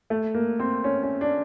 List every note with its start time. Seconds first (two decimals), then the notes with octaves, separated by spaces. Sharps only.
0.10 A3
0.34 A#3
0.59 C4
0.84 C#4
1.03 C#4
1.21 D4